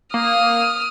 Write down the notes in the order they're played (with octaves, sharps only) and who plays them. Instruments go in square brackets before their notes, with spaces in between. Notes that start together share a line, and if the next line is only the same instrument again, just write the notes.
[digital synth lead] A#3 [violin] D#6 F6